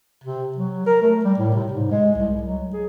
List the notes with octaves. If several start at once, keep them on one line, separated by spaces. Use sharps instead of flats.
C3
F#3
A#4
A3
G3
A2
C3
G#2
G#3
C2
F#3
G#4